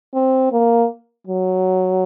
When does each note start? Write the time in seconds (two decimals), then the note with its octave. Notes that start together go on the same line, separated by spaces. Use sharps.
0.14 C4
0.52 A#3
1.27 F#3